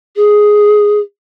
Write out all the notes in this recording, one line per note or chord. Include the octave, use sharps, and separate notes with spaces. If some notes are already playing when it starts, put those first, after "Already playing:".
G#4